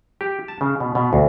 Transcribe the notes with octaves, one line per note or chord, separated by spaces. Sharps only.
G4
A5
C#3
B2
B2
D2